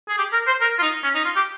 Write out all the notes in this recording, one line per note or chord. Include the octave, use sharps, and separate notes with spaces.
G#4
G4
A#4
C5
A#4
F4
D#4
C#4
D#4
F4
G4